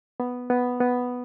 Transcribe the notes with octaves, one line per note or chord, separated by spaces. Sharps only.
B3
B3
B3